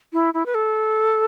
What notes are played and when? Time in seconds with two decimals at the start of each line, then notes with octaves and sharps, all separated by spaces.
0.13 E4
0.34 E4
0.46 B4
0.54 A4